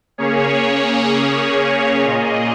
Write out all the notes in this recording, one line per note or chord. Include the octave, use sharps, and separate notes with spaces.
C#3 A#3 C#4 G#4 C#5
A#2 A#3 F4 G#4 D#5